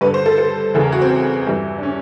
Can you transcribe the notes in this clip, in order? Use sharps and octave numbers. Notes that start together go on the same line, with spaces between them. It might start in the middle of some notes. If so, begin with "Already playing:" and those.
G2 D3 B4
C5
A4
A4
E2 C#3 E3 A4
A#4
F#4
C4
G2 E3
D4
C#4